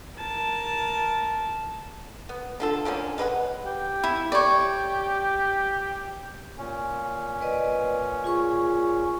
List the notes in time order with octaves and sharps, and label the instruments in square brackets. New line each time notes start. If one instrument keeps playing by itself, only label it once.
[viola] A#4 A5
[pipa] B3
D3 F4 A4
D3 F3 A#3 C#4
G#3 B4 D5 F#5
[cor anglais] G4
[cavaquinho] E4
[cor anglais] G4 [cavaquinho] C#5 D5
[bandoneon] A#2 C#4
[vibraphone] B4 D5 D#5
F4 G#4 C#6